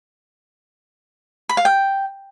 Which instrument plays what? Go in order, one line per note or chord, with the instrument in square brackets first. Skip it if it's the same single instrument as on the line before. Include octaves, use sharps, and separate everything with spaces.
[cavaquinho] B5
F5
G5